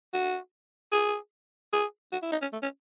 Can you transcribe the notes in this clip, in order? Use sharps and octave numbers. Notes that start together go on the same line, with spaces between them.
F#4
G#4
G#4
F#4
E4
D#4
C#4
A3
C#4